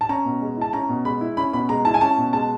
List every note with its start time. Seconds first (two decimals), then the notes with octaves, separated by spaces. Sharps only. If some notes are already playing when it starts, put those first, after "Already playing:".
0.01 A5
0.09 C#4 A#5
0.25 B2
0.42 G#3
0.57 E4 A5
0.73 C#4 A#5
0.89 B2
1.05 G#3 B5
1.21 E4
1.37 C#4 B5
1.53 B2 B5
1.69 G#3 A#5
1.85 E4 A5
1.94 G#5
2.01 C#4 A5
2.18 B2
2.33 G#3 A5